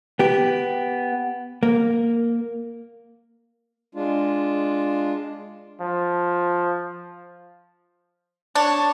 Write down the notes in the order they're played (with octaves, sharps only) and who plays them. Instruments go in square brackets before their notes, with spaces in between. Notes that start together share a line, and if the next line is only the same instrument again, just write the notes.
[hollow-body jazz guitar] B3 G4
A#3
[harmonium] G#3 D4 F4
[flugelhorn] F3
[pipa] D4 [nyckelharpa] C#5 A5